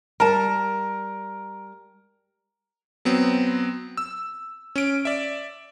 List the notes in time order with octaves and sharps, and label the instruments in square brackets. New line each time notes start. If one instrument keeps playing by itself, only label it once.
[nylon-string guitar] G3 A5 [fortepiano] A#4
[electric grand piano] F#3 B3 C4
E6
C#4 D7
D5 E5